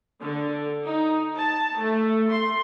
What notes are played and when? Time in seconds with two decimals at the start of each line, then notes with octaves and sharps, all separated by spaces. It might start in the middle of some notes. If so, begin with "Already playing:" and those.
0.20 D3
0.85 D#4
1.37 A5
1.80 A3
2.29 C6